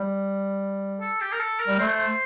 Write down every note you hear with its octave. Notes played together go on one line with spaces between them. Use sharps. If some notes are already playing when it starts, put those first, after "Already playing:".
Already playing: G3
A4
G4
A#4
A4
A#4
G3
A3 C5
C5